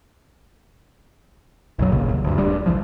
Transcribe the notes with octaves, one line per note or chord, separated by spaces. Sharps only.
F#1 B1 F#3
A#1 A#2 C#3
D#2
D2 G2
D1 G3 D4
A#1 E3 F3